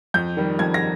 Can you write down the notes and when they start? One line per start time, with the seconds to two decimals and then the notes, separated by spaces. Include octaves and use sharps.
0.14 F2 G6
0.37 D#3 G3
0.59 F2 G#6
0.74 A#6